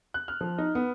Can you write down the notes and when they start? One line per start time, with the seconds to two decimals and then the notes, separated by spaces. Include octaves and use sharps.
0.14 F#6
0.28 F6
0.41 F3
0.58 D#4
0.75 B3